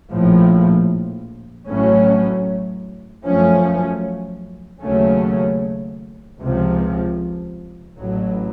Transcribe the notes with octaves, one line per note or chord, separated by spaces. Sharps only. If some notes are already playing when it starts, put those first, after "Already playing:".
A#1 A2 F3
A1 A2 F#3 A3 C#4
F#2 F3 A3 C#4
D#2 C#3 F#3 A3 C#4
C#2 C3 F3
A1 A2 F#3